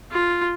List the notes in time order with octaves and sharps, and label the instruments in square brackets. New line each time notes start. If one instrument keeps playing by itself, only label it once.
[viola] F4